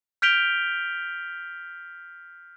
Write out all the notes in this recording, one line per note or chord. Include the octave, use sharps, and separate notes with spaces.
F6 G6 B6 D7 F7 G7